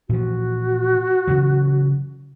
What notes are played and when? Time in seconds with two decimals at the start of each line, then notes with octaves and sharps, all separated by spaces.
0.09 A#2 E3 F3 F#4
1.27 C#3 E3 F#3